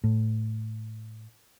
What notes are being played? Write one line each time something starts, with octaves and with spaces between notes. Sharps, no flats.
A2